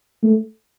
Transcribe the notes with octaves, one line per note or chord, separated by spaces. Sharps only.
A3